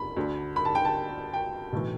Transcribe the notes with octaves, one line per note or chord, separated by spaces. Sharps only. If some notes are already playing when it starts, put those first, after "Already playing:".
Already playing: B5
D2 D3
B5
A5
G5
A5
G5
B1 A2 E3